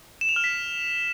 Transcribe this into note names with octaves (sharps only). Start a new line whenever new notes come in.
E7
F7
F6
B6